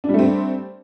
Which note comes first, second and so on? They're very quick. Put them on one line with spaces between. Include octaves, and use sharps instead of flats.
D4 G3 A3 C4